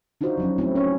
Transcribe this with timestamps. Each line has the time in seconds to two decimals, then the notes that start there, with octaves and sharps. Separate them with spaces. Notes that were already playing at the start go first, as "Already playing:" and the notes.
0.21 D4 D#4 F4 F#4 C5
0.38 F3 F#3 C#4
0.58 A3 C4 E4
0.75 C#4 C#5